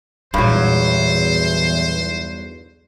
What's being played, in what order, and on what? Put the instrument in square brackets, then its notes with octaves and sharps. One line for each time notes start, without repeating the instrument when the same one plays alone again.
[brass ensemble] B1 E2 [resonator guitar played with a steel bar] G2 F#3 [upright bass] A#2 G#3 [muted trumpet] C5